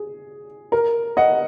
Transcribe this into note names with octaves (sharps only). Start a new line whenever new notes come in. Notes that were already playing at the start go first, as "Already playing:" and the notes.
Already playing: G#4
A#4
D#5 F#5